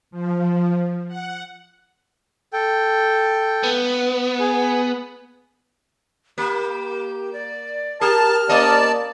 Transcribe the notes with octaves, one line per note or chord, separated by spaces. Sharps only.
F3
F#5
A4 G5
B3
G#4
A#3 G4
D5
G4 A#4 A5 F6
A#3 B3 D5 D#5 A5